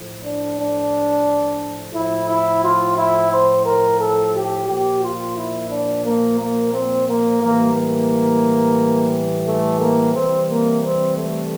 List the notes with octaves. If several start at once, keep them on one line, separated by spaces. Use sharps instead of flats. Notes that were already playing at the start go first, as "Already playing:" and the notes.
Already playing: A2 F3
D4
D4
A2 F3 E4
E4
F4
E4
C5
A#4
A4
G4
A#2 F3 G4
F4
E4
D4
A#3
A#3
C4
A#3
A2 E3 G3 A#3
A#3
A3
A#3
C3 E3 G3 C4
A#3
C4
A3